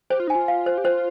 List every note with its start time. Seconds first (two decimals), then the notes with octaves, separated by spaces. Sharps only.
0.10 G4 C5
0.20 F4
0.27 D#4 G#5
0.35 F4
0.48 F5
0.66 C5
0.78 G4
0.84 F4 C5